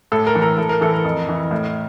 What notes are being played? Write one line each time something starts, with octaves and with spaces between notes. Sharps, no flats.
A2 A4
A#4
E3
A#4
A2 A4
A#4
E3 A4
A#4
F2
E3
A2